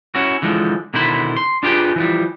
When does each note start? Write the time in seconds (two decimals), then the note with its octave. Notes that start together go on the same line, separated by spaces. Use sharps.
0.15 C#4 E4 F#4
0.42 D3 E3 F3 G#3
0.94 B2 D3 D#3 E4 C5 B5
1.37 C6
1.63 D4 F4 G4 G#4 B4 G5
1.96 E3 F3 G3